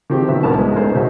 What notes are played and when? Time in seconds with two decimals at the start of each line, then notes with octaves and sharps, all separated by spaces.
0.10 D#3 F3 C4 G4
0.28 D#3 F#3 B3 E5
0.43 C2 A#2 B3 D4 A#4 A5
0.58 G#2 G#3
0.76 G#3 A3 B3 C#4 A#4 C5
0.94 B2 D#3 D#4 C5 E5